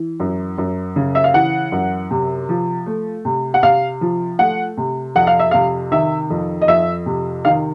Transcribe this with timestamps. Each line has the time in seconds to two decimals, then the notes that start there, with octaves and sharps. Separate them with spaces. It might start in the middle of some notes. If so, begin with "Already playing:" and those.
Already playing: E3
0.20 F#2
0.58 F#2
0.96 C#3
1.15 E5
1.24 F5
1.34 E3 F#5
1.72 F#2
2.11 C3
2.49 F3
2.86 A3
3.25 C3
3.54 F#5
3.63 C3 F5
4.01 F3
4.39 A3 F#5
4.77 C3
5.15 F2 F#5
5.27 F5
5.40 E5
5.51 C3 F5
5.92 D#3 E5
6.30 F2
6.62 D#5
6.68 F2 E5
7.06 C3
7.45 D#3 F5